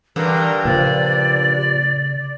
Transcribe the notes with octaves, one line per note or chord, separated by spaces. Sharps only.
G2 D3 E3 A#4
A#2 C#3 F3 D5